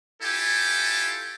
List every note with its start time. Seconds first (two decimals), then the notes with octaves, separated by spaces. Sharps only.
0.21 E4 F4 G4 A4 G#5